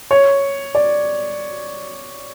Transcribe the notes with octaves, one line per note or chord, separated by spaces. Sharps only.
C#5
D5